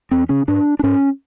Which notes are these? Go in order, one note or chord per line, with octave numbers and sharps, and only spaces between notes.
E2 C4
C#3 C#4
G#2 D4
D4
G#2 C#4